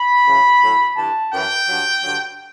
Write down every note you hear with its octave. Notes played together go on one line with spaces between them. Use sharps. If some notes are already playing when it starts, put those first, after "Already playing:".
Already playing: B5
F#2 C#3 E3
A2 F#3
G2 E3 A5
F#2 E3 G5
G2 F#3
G2 D3 F#3